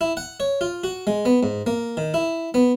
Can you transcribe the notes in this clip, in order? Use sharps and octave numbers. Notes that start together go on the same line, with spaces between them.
E4
F#5
C#5
F4
F#4
G#3
B3
G#2
A#3
D#3
E4
B3